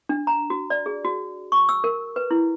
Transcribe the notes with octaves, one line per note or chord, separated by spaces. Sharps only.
D4
A#5
F#4
D5
G#4
F#4
C#6
E6
A#4
B4
E4